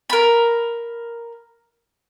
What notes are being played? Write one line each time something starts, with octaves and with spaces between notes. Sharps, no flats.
A#4 B5